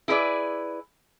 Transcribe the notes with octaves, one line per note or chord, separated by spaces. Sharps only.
E4 G#4 B4 D5